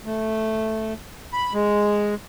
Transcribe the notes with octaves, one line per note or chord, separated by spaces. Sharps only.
A3
B5
G#3